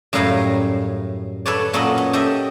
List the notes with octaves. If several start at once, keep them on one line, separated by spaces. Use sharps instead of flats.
F#2 A2 G3 F5 G#5 A#5
A4 B4 C#5 D5
A#2 F#3 C#4 A4 B4 D#5
C#4
G4 A4 D#5 E5